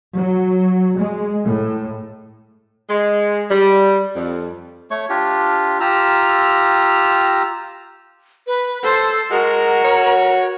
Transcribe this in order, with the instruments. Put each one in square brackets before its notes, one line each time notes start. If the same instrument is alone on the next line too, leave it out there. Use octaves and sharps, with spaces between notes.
[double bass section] F#3
G#3
A2
[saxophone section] G#3
G3
F2
[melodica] A3 C#5 C#6
D4 F4 G4
F4 G4 A#5 E6
[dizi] B4
[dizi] A4 [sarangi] C5
[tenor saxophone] G#3 [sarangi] F#4 [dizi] A#4
[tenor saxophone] C#5